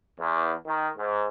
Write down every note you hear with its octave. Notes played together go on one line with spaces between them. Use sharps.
E2
D#3
G#2